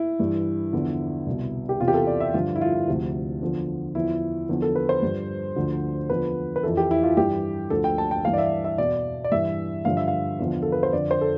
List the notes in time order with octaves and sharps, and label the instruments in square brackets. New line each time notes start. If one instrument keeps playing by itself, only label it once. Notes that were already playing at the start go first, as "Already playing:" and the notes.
Already playing: [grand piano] E4
G2 E3
E2 D3 F3
C2 B2
G4
E2 C3 E3 F4
G4
A4
D5
E5
G2 D3 F3 F4
E4
F4
E4
D2 C3 F3
E2 D3 F3
E2 D3 F3 E4
E2 D3 F3
A4
B4
C5
G2 F3
D2 D3 F3
E2 D3 F3 B4
B4
F2 E3 A4
G4
E4
F4
G2 E3 G4
D2 D3 F3 A4
G5
A5
G5
G2 E3 F5
D5
E5
E5
E2 B2 D5
D5
G2 E3 E5
G2 D3 F3 F5
E5
F5
E2 D3 F3
A4
B4
C5
F2 D3 F3 D5
C5
A4